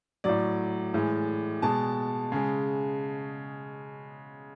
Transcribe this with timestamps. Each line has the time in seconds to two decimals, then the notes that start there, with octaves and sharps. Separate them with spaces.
0.24 A2 F#3 D5
0.94 A2 E3 G#3
1.62 B2 G#3 A5
2.32 C#3 G#3